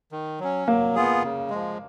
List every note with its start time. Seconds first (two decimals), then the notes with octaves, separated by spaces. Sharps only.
0.12 D#3
0.40 F#3 C#4
0.68 F#3 A#3
0.95 B3 F4 G#4
1.23 C#3
1.50 F3 G#3